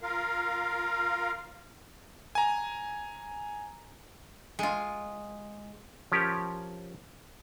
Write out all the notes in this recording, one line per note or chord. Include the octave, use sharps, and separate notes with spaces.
F4 A#4 F5
G#5 A#5
G#3 F4
F3 C#4 G4 A#4